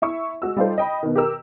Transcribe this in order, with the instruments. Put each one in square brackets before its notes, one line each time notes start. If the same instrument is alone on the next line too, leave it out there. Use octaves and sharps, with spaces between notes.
[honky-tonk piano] E4 E5 C#6
G#3 F#4 E6
G3 D#4 F4 A4 C5
D#5 G5 B5
B2 D#3
G4 A#4 E6